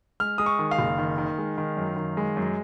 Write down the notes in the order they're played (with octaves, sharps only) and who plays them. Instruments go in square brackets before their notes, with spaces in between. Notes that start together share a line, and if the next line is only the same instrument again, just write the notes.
[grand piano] G#3 F6
G#3 D#6
C#6
D#3
F5
F#1
D#3
D#3
G#3
D#3
F#2
D#3
G#3
F#2